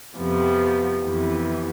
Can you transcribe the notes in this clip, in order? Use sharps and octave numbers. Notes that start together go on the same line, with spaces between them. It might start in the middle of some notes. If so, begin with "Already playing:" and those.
F2 C3 F3 B3
F2 C3 E3 B3